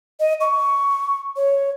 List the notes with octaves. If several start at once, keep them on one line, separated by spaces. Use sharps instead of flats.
D#5
C#6
C#5